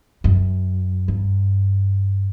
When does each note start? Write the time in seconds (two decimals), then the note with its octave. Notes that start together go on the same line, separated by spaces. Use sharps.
0.24 F#2
1.08 G2